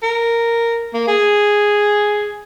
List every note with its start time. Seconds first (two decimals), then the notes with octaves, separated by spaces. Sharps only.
0.03 A#4
0.94 A#3
1.08 G#4